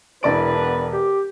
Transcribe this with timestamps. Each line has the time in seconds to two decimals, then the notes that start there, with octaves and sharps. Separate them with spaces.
0.23 E1 C#3 D4 E4 B4 D5 D7
0.58 B3
0.92 G4